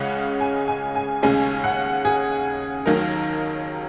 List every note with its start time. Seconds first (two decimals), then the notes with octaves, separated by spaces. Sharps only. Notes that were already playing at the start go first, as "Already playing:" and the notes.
Already playing: C#2 C#3 G#3 C#4 F#5
0.41 G#5
0.68 G#5
0.96 G#5
1.22 D#2 C#3 G#3 C#4 G#5
1.64 F#5
2.05 G#4
2.86 D#2 D#3 F#3 A#4